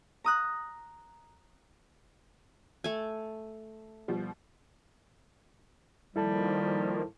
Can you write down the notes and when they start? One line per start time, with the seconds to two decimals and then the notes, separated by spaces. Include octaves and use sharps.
0.24 A#5 D#6 F#6
2.84 A3 G#5
4.08 B2 F3 G3
6.16 D#3 F3 G3 A#3 E4 A4 A5